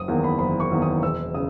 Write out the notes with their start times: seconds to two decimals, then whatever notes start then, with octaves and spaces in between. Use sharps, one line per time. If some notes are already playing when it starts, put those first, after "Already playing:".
Already playing: F#1 D#6
0.08 E2 D#3 A#3
0.24 B5
0.39 F#1 B5
0.60 C#6
0.72 E2 D#3 A#3
0.82 D#6
1.02 E1 E6
1.34 C#3 D#6